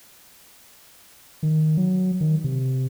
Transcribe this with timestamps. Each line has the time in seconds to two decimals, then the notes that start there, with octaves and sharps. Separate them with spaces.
1.43 D#3
1.77 F#3
2.21 D#3
2.44 C3